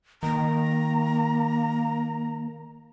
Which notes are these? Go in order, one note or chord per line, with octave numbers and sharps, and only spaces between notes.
D#3 A#3 A#5